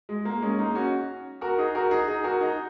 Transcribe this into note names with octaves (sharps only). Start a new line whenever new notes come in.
G#3
A#3
G#3 C#4
A#3 D#4
C#4 F#4
F#4 A#4
D#4 G#4
F#4 A#4
D#4 G#4
D#4 G#4
F#4 A#4
D#4 G#4